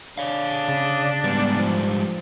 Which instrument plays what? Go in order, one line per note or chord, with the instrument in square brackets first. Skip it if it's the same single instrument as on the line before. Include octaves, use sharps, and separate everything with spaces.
[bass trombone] D4 [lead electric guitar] C#5 F5
[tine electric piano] C#3 A5
[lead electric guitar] G#2 G3 [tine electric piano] B3
[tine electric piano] F3